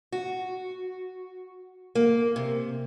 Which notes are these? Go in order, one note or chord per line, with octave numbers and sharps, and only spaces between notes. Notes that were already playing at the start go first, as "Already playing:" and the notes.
F#4
A#3
C3